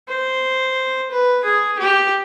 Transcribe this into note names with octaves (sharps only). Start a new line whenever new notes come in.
C5
B4
G#4
G4